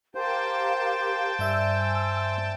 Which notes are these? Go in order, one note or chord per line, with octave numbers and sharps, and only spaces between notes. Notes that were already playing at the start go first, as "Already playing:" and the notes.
G4 A#4 C5 F5 G5 A5
G2 D5 E5 G#5 E6